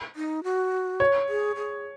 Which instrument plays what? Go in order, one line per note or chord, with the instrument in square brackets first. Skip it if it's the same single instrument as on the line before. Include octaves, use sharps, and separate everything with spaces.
[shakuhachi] D#4
F#4
[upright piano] C#5
[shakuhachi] G#4
G#4